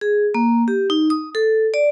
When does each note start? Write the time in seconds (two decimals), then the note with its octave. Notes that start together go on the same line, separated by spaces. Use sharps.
0.01 G#4
0.35 A#3
0.68 G4
0.90 D#4
1.10 D#6
1.35 A4
1.74 D5